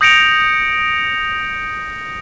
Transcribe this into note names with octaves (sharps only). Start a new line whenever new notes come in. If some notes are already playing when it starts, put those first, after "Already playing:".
D#6 G6 A#6 C#7 D7 F7